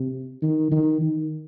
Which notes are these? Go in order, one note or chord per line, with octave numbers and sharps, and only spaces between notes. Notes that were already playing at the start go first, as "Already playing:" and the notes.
Already playing: C3
D#3
D#3
D#3